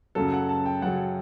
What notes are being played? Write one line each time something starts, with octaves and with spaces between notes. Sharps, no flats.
F#2 C#3 F#3 A4
F#5
A5
G5
F#2 C#3 F#3 F#5